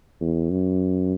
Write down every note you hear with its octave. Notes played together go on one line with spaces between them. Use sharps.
E2
F#2